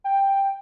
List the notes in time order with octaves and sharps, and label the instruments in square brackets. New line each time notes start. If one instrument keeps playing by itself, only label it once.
[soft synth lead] G5